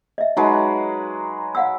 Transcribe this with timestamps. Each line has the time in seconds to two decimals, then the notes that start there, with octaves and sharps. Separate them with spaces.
0.18 D#5 E5
0.37 F#3 G#3 D#4 B4
1.55 F5 F#5 E6